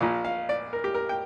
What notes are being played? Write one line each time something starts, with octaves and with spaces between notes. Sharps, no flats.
A#1 A#2 F5
F5
D5
A#4
G4
A#4
G5